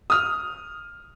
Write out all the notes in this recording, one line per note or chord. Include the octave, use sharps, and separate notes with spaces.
D#6 F6